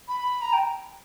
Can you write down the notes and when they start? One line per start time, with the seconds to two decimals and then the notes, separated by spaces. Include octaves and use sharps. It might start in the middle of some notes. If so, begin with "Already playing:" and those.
0.08 B5
0.42 A#5
0.53 G5